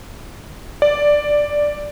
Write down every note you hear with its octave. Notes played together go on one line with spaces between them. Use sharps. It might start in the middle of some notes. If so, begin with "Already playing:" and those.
D5